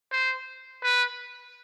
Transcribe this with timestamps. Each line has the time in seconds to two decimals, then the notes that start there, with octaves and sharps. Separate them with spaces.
0.12 C5
0.83 B4